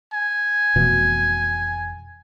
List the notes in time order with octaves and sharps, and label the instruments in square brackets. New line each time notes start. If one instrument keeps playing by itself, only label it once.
[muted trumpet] G#5
[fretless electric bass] F1 B2 E3